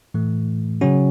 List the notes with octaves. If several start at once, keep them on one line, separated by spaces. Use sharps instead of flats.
A2 E3 A3
C#3 F#3 C#4 F#4